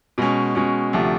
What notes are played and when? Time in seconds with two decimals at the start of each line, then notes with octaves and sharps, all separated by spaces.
0.18 B2 G#3 C#4
0.55 B2 G#3 C#4
0.93 D2 C3 F3